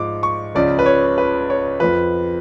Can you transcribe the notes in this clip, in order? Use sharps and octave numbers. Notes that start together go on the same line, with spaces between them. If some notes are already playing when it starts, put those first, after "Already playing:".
Already playing: G#2 F3 D6
C#6
C#2 C#3 F3 D5
B4
C#5
B4
C#5
F2 F3 B4